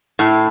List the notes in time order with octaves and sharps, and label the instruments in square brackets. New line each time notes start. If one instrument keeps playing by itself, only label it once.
[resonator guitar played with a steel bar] A2